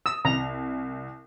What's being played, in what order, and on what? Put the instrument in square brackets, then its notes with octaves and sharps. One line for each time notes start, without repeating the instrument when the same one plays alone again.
[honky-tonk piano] D#6 [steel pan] E6
[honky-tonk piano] C2 [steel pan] A#5